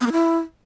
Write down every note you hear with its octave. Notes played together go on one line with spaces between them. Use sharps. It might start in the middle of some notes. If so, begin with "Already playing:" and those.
B3
A#3
E4